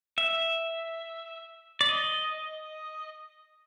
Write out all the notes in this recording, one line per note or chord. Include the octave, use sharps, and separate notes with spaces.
E5
D5
D#5